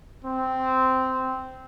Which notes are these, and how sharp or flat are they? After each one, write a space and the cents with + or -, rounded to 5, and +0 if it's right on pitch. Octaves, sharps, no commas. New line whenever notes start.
C4 -10